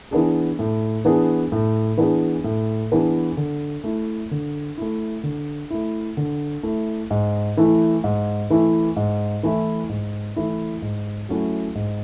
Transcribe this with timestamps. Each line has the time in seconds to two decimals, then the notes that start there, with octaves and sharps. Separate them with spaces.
0.11 E3 B3 D4 G#4
0.59 A2
1.05 E3 B3 D4 G#4
1.52 A2
1.97 E3 B3 D4 G#4
2.44 A2
2.92 E3 B3 D4 G#4
3.37 D3
3.84 A3 E4
4.31 D3
4.78 A3 E4
5.23 D3
5.70 A3 E4
6.17 D3
6.63 A3 E4
7.11 G#2
7.57 E3 A3 E4
8.04 G#2
8.50 E3 A3 E4
8.96 G#2
9.43 E3 A3 E4
9.89 G#2
10.36 E3 A3 E4
10.82 G#2
11.29 F#3 A3 C#4 E4
11.75 G#2